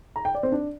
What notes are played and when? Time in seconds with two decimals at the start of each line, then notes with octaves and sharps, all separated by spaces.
0.16 A#5
0.25 G5
0.35 D5
0.43 C4
0.52 D4